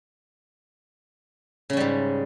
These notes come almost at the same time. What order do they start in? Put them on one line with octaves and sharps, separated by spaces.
C#3 C#4 G3 G#2